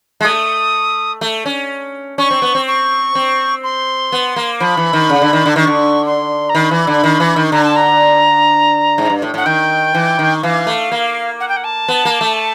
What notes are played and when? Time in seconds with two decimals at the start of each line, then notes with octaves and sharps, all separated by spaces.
0.20 G#3
0.24 A3 D#6
1.21 A3
1.46 C#4
2.18 C#4 C#6
2.31 C4
2.42 B3
2.55 C4
2.67 C#6
3.15 C4
3.63 C6
4.12 B3
4.36 A#3
4.60 F3 B5
4.77 E3
4.93 D#3
5.09 C#3
5.22 D3
5.33 D#3
5.46 D3
5.56 D#3 C#6
5.67 D3
6.06 C6
6.49 A#5
6.55 D#3 B5
6.71 E3
6.87 D3
7.04 D#3
7.20 E3
7.36 D#3
7.51 D3 A#5
7.64 A5
7.76 A#5
8.98 G#2
9.10 G2
9.22 A2
9.34 A2 F#5
9.46 D#3 G5
9.94 E3
10.19 D#3
10.42 E3 F5
10.67 A3
10.92 A#3
11.40 F#5
11.48 G5
11.56 F#5
11.64 A5
11.88 B3
12.05 A#3
12.21 A3